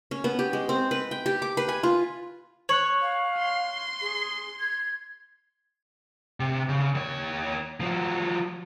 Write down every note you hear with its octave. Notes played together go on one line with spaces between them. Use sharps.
C#4
B3
G4
G#3
C4
B4
G5
G4
D6
B4
G#5
F4
C#5 F#6 C#7 F#7
F5
C6
G#4
G#6
C3
C#3
D#2 C#5
F3 F#3